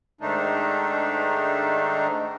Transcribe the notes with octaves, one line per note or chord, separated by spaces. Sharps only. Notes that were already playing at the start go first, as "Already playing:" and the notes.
G#2 D#3 A3 D4 D#4